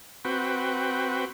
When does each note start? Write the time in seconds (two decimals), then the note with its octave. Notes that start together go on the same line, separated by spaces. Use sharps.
0.25 C4 F#4 B4 G5